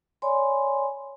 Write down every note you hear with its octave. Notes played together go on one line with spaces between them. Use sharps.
C#5 D5 G#5 B5 C6